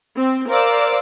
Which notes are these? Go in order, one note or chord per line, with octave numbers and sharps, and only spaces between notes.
C4
A#4 C5 D5 F5 D6 E6